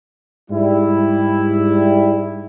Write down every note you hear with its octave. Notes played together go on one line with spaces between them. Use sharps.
G#2 G3 E4